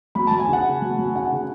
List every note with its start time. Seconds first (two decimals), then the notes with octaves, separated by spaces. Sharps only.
0.15 F#3 B5
0.27 F#3 A5
0.40 G#5
0.49 C#3 F#5
0.65 C#3
0.82 F#3
0.99 F#3
1.16 C#3 F#5
1.32 C#3